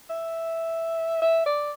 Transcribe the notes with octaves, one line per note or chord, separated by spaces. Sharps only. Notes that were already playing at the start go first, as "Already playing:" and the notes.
E5
E5
D5